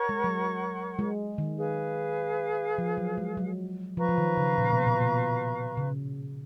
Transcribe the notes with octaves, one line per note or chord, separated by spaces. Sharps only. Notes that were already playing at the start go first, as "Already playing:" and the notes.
Already playing: A#4 C#5 F#5 C#6
G#3
F#3
G#3
D#3
G#4 B4 F5
F3
F#3
G#3
F#3
F3 B4 F5 A#5 C#6
F3
D#3
C#3
A#2
B2
A#2
B2
C#3